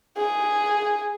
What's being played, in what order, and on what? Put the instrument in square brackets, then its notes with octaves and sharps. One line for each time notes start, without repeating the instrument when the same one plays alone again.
[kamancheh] G#4